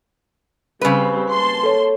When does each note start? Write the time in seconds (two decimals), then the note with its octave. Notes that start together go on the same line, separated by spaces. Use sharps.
0.81 C#3 G3 C4 B4
1.31 A#3 A5 C6
1.63 A4 C#5